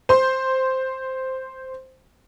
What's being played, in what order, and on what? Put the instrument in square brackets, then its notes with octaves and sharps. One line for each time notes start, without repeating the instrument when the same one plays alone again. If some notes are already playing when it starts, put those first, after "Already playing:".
[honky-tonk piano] C5 C6